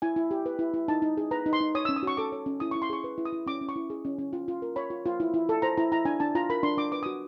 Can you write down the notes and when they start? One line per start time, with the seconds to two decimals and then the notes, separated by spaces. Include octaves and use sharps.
0.02 E4 G#5
0.16 E4
0.31 G4
0.46 B4
0.59 E4
0.74 E4
0.88 D#4 A5
1.02 D#4
1.17 G#4
1.31 B4 A#5
1.46 D#4
1.53 C6
1.61 D#4
1.75 C#5 D#6
1.85 E6
1.89 C#4
1.96 D#6
2.03 F#4 C#6
2.17 A4 D6
2.32 C#5
2.46 C#4
2.60 E4 D#6
2.71 C#6
2.75 E4
2.82 C6
2.90 G#4 C#6
3.04 B4
3.18 E4
3.25 D#6
3.33 E4
3.46 C#4 D6
3.61 C#4
3.69 C#6
3.76 E4
3.90 G#4
4.05 C#4
4.19 C#4
4.33 F4
4.48 F4
4.62 A#4
4.76 C#5 B5
4.90 F4
5.06 F4
5.20 E4
5.34 E4
5.49 A4
5.62 C5 A#5
5.78 E4 A#5
5.92 E4 A#5
6.05 D4 G#5
6.20 D4 A5
6.35 F4 A#5
6.50 A#4 B5
6.63 D4 C6
6.77 D4 D6
6.92 B4 D6
7.03 D#6
7.06 F#4